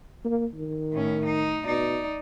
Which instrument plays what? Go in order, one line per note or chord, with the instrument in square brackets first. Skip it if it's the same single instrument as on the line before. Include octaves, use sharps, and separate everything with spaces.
[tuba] A#3
D#3
[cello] A2 C#4
D#4
[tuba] B2 [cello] D#4 D5